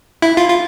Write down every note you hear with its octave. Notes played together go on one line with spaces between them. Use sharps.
E4
F4
F4